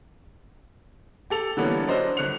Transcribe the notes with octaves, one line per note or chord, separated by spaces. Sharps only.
G4 A4 F7
D3 E3 G3 A#3 B3 C#4
F#3 C#4 D4 C5 D#5
G1 F#6 C#7 F7